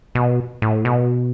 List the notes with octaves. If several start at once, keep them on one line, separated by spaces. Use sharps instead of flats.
B2
A2
B2